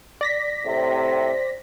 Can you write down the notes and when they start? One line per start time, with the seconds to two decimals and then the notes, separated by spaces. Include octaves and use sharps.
0.21 D5 A#6 B6
0.66 A2 C3 C5